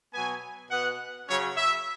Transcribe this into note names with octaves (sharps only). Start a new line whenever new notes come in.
B2 F#3 B3 G#5
B2 B3 F#5
C#3 F#3 C#4 C#5
E5